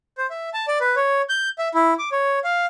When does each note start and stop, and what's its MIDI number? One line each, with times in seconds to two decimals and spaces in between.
0.18 0.26 72
0.30 0.49 76
0.54 0.66 81
0.68 0.78 74
0.80 0.95 71
0.96 1.22 73
1.29 1.49 91
1.58 1.68 76
1.74 1.94 64
1.99 2.09 86
2.12 2.39 73
2.44 2.66 77